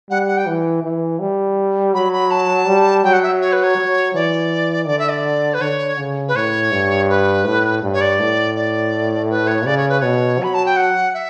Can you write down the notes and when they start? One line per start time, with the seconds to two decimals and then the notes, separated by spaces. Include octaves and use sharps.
0.10 G3 F#5
0.28 F#5
0.38 G5
0.46 E3
0.83 E3
1.20 G3
1.94 F#3 B5
2.13 B5
2.31 A5
2.67 G3
3.04 F#3 G5
3.13 F#5
3.23 E5
3.42 C#5
3.53 B4
3.63 C#5
3.78 F#3
4.14 E3 D5
4.88 D3 D5
4.99 E5
5.09 D5
5.54 B4
5.61 D3 C#5
5.98 C#3
6.28 B4
6.35 A2 C#5
6.72 G2
7.09 B4
7.46 A2
7.83 G2
7.93 C#5
8.01 D5
8.20 A2
8.56 D5
9.30 B4
9.47 C#5
9.66 C#3 D5
9.77 C#5
9.89 B4
10.00 B2 C#5
10.40 F#3 B5
10.54 A5
10.66 G5
10.77 F#5
11.14 E5